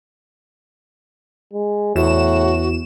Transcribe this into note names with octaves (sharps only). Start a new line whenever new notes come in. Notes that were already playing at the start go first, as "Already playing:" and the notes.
G#3
E2 A2 F#4 E7